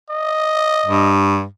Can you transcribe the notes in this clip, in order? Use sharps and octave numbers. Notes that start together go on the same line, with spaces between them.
D#5
G2